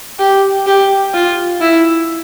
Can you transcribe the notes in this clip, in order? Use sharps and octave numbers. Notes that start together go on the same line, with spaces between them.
G4
G4
F4
E4